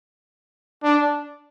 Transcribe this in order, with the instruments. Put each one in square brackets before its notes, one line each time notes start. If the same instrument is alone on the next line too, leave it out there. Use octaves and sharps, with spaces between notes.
[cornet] D4